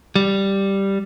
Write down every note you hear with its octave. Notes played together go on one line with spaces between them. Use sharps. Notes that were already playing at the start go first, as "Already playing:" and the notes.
G3